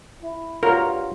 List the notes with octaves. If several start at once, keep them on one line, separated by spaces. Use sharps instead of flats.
E4
G2 F4 F#4 A#4 C#5